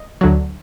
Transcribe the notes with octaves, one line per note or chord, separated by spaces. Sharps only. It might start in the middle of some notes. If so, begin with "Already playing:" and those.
Already playing: D#5
D2 D3 F#3